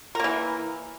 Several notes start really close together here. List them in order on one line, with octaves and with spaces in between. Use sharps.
A#4 A#3 E3